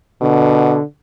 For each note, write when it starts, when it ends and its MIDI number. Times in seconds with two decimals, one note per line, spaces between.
0.21 0.77 47
0.21 0.82 50